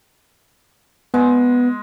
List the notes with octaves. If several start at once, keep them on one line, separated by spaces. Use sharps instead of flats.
G#3 B3